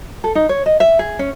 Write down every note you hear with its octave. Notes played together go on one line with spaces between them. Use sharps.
A4
D#4
C#5
D#5
E5
G#4
C#4